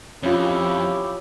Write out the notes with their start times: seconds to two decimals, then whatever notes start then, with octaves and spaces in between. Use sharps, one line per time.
0.23 F2 C#3 C#4 E4 F4 G4